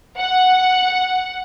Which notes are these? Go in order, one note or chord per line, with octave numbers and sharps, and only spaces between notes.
F#5